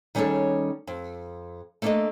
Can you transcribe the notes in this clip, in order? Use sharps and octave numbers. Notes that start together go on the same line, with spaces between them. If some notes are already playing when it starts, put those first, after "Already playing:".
D#3 G3 C#4 G#4 A4 C#5
F2
A3 A#3 D4 F#4 A4 D#5